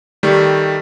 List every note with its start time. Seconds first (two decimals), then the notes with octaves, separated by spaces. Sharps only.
0.23 D#3 G3 A3